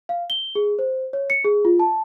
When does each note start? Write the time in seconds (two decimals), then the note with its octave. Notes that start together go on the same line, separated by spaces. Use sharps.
0.09 F5
0.30 G7
0.55 G#4
0.79 C5
1.13 C#5
1.30 C#7
1.45 G#4
1.65 F4
1.79 A5